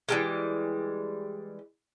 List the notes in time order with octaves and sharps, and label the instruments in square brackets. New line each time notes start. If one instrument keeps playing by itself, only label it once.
[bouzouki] E3 G3 G#3